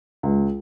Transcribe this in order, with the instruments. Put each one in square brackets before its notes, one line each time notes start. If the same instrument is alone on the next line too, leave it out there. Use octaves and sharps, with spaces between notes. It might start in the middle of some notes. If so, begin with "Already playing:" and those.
[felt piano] C#2